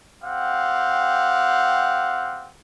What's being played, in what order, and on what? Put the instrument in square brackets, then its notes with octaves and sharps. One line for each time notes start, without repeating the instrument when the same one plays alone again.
[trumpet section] C4 G4 F5 F#5